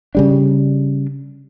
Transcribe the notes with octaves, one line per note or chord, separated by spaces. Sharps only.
C#3 G3 D4